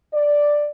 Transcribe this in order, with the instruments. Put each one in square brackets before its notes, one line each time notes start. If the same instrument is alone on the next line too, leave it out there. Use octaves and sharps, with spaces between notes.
[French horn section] D5